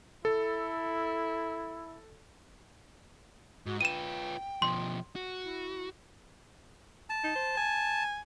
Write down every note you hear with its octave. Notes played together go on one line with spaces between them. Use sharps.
E4 A4
G#2 F#4
F4 B4 G5 D#7 E7
B2 F3 C6
F#4
E4
A5
D#4
C5
G#5